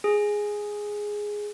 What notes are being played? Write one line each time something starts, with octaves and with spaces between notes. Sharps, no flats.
G#4